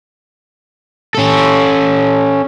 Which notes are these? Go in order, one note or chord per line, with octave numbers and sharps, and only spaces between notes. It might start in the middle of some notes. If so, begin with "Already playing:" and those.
C#4 A4